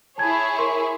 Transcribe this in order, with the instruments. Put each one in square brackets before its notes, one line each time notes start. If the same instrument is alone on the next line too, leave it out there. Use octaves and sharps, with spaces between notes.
[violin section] E4 G#4 C#5 [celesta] A5 G#6
[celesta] A#4 C6 C#6